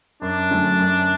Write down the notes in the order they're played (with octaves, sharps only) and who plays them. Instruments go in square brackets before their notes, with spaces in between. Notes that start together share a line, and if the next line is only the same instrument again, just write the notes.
[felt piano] F#2 [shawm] D4
[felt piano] D3 F#3 A3 C#4
F#2